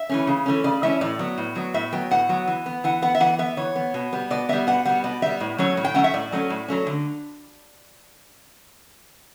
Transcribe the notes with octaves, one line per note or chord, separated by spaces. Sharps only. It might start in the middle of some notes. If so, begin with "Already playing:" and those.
Already playing: E5
E3 A3 C#4
C#3
E3 A3 C#4
C#3 D5
E3 A3 C#4 E5
A2 D5
F#3 B3
A2
F#3 B3
A2 E5
F#3 B3 G5
A2 F#5
F#3 B3
E3
B3
E3 F#5
B3 F#5
E5
E3 F#5
B3 E5
E3 C#5
B3
B2
G3 B3
B2 D5
G3 B3 E5
B2 F#5
G3 B3 F#5
B2 D5
G3 B3 E5
A2
F#3 A3 C#4 C#5
A2
G5
F#3 A3 C#4 F#5
E5
A2 D5
F#3 A3 C#4
A2
F#3 A3 C#4
D3